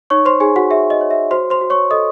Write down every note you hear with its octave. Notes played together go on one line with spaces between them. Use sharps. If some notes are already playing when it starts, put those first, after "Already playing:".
D#4 C#5 C#6
C5 C6
D#4 G#4 G#5
F#4 F#5
G#4 E5
D#5
C#5
E5
F#4 C5 C6
C5 C6
F#4
C#5 C#6
A4 D#5 D#6